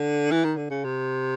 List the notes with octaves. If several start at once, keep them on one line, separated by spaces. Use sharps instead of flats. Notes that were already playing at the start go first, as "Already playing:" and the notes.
Already playing: D3
E3
D#3
D3
C#3
C3